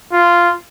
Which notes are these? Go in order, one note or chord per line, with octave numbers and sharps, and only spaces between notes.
F4